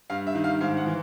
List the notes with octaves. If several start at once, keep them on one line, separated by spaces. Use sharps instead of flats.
G2 F5
E5
D#3
F5
G#2 F5
F#5
E3